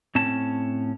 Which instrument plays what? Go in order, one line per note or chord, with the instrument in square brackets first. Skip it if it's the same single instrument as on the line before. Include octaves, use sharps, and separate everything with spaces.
[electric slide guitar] A2 C4 C#4 A5